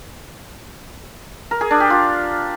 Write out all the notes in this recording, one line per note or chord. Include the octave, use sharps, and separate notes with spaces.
A#4
G#4
D4
G4
F4